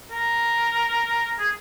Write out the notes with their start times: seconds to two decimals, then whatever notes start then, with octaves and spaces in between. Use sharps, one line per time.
0.11 A#4
1.39 G#4